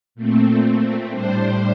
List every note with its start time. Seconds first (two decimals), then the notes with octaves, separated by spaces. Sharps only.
0.15 A#2 A3 C4
1.09 A2 G3 D4 C5